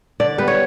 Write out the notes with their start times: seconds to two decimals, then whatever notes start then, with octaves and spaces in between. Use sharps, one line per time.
0.20 D3 D5
0.38 G3 B3 B4
0.48 C#5